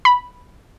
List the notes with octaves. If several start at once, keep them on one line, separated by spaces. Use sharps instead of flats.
B5